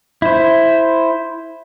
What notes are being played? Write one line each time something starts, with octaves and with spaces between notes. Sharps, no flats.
E4 C5